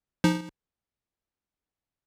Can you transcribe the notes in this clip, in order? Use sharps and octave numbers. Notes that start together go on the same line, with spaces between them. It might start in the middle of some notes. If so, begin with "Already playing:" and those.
F3 D#4